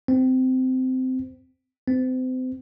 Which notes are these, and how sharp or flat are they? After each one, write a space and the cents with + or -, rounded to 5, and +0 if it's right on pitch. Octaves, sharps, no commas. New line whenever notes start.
C4 -20
C4 -35